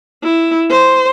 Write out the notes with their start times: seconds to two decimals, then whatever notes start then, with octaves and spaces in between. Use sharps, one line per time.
0.23 E4
0.70 C5